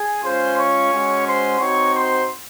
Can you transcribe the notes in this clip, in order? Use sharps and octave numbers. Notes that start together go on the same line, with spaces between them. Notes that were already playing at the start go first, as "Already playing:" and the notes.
Already playing: G#4 G#5
G#3 C#4 F4 C5 C6
C#5 C#6
G#3 C#4 F#4
C5 C6
C4 D#4 F#4 C#5 C#6
C5 C6